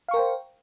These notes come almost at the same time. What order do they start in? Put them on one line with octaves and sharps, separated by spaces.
F5 C#6 A#4 G5 C5